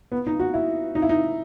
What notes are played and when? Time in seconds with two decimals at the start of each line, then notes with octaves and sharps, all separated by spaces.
0.12 B3
0.27 D#4
0.40 F#4
0.54 E4
0.95 D#4
1.02 E4
1.09 D#4